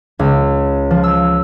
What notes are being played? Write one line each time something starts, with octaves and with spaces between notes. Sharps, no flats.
C#2
F3
E6